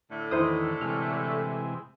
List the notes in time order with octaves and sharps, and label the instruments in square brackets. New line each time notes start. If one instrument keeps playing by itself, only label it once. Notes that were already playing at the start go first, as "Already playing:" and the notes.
[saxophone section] A2 D3 A3
[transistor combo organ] E2 D#3 [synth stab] E4 C5 D#6
[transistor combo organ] C3 E3 G#3 [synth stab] F6